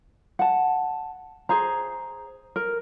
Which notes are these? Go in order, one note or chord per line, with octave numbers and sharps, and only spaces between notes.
F#5 A5
G#4 C5 A#5
A#4